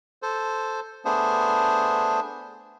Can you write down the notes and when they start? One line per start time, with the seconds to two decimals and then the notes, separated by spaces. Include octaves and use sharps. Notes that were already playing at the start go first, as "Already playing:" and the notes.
0.22 A4 C5
1.05 A3 B3 D4 G#4 C5